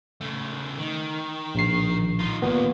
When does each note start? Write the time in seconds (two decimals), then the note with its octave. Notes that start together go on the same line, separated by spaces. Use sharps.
0.21 C#3 A3
0.79 D#3
1.55 A#1 C7
2.19 D#4 F4
2.42 D#2 A#2 B3